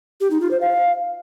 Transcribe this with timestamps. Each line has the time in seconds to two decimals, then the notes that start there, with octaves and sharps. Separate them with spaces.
0.21 G4
0.31 D#4
0.41 F4
0.51 C5
0.61 F5